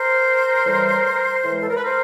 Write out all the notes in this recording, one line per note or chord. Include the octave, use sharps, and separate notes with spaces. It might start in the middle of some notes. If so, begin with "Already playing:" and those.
Already playing: A#4 C5
A2 E3 G3
A2 E3 G#3
A4
A#4
B4
A#4 C5